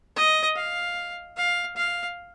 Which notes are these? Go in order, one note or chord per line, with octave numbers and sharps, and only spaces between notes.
D#5
F5
F5
F5